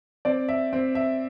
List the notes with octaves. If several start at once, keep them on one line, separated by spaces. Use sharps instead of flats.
C4 D5
E5
C4
E5